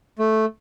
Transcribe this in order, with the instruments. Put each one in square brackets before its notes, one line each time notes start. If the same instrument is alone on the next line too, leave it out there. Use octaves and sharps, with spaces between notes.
[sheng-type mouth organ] A3